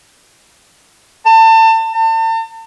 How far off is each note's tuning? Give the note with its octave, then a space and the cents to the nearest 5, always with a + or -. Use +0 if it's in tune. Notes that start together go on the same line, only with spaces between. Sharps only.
A5 +30
A5 +40